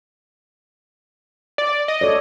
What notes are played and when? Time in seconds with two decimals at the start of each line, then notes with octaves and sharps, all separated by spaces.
1.58 D5
1.88 D#5
2.01 A4 C#5 D5